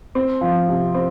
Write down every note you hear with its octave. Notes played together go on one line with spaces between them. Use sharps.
C4
F3
C3
C4